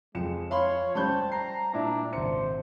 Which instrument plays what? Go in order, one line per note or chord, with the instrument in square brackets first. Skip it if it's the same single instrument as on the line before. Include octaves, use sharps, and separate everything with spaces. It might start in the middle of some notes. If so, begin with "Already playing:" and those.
[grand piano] F2 C#7 E7 [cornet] G#3
[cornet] C#5 [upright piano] F5 B5 C6
[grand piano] G3 C#4 C5 [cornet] A5 [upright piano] B5 C#6 G6
[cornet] A#5 [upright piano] C7
[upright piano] A#2 E4 [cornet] D4
[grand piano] G#1 C#7 [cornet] C5